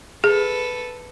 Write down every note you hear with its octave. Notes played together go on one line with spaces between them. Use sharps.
G#4 A4 B4